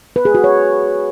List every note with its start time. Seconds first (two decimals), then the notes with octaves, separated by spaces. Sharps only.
0.16 B4
0.25 G#4
0.35 F#4
0.44 C#5